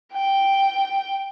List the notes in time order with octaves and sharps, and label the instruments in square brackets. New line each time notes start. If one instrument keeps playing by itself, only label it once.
[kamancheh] G5